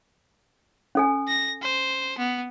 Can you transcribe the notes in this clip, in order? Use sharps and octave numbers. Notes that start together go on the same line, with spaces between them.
C#4 A4 G#5
A#6
C5
B3